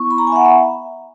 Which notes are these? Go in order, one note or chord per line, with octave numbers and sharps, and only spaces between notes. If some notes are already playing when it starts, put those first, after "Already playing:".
Already playing: B3 E4 C#6
B5
A#5
G#5
E5
F#5
E5